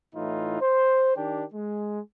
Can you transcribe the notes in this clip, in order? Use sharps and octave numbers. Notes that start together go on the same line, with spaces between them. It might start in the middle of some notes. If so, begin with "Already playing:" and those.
A2 E3 D#4 F4
C5
D#3 D4 G4
G#3